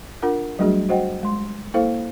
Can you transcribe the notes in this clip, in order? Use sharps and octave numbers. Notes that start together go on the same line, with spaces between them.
D4 F4 A#4 F#5
F#3 G3 A3 D4 F#4 G#4
F#4 C5 D#5 F#5 G5
G#3 C6
A#3 E4 A4 C5 F5